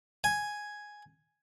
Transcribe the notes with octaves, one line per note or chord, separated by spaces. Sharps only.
G#5